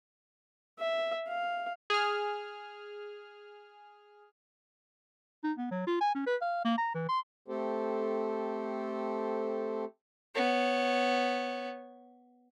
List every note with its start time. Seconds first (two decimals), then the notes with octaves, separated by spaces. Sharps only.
0.79 E5
1.28 F5
1.90 G#4 F6
5.44 D#4
5.58 B3
5.71 F#3
5.87 F4
6.01 G#5
6.15 C#4
6.26 B4
6.42 F5
6.65 A#3
6.78 A#5
6.94 E3
7.09 C6
7.48 A3 C4 G4 A4 C5
10.35 B3 C#5